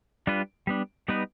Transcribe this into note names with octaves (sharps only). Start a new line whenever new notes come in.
G3 D4 F4 B4
G3 B3 D4
G3 B3 D#4 B4